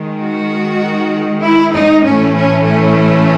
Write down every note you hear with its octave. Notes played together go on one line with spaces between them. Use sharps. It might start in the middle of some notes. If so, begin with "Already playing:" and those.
Already playing: D#3 G#3
F#4
E4
D#4
A2 E3 A3 C#4
C#4
C#4